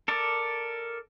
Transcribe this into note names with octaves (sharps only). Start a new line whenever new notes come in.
A4 A#4 D5